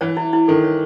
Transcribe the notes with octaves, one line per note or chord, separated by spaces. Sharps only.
E3 C#5
E4
E4
D#3 A4
C#5